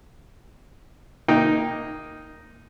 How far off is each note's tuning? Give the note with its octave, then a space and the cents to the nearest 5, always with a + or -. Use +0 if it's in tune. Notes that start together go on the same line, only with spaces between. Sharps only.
A#3 +0 D#4 +0 G5 +5